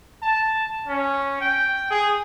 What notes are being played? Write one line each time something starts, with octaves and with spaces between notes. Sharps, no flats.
A5
C#4
G5
G#4